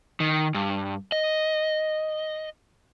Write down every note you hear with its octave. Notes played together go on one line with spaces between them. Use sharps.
D#3
G2
D#5